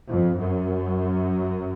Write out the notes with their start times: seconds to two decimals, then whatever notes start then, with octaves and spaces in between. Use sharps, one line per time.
0.08 F2
0.37 F#2